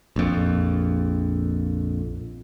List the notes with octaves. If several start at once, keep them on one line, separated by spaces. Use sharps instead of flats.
A#1 F2